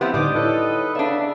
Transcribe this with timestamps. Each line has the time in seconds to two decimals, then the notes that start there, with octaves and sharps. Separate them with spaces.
0.01 F3 B3 C4 E4 F4 G4
0.14 A2 D3 G3 D#4 D#5 D6
0.35 D#4 E4 A4 B4 C#5
0.95 C#3 B3 D4 D5 E5